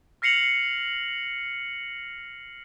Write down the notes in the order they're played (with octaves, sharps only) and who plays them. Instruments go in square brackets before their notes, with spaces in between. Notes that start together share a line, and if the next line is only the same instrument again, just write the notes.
[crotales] F6 A#6 C7 C#7 F7 F#7